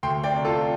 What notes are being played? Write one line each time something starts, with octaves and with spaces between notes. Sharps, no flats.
D2 G5 C6
D5 G5
C3
F4 A4